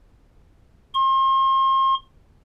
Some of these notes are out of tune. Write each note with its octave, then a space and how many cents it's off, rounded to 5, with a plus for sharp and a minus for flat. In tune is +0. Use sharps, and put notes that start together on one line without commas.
C6 +40